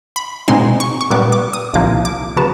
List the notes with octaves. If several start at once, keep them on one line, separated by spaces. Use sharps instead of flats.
B5
B2 G#3 C4 D#4 C6
C#6
C#6
A#2 G3 B3 D6
D6
D#6
C2 A#2 F3 A#3 D6
D6
C#3 F#3 B3 A5